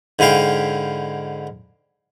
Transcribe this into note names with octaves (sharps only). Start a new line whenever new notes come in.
G#2 D3 E4 F5 G5